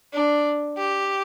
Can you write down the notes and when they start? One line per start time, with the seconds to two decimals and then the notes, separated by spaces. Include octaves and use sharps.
0.13 D4
0.77 G4